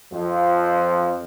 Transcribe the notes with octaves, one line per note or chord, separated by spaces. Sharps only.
F2 F3